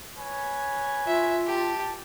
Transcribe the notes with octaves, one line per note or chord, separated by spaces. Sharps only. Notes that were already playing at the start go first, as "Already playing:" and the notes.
B4 C#5 G#5
F4 E5
G4 A5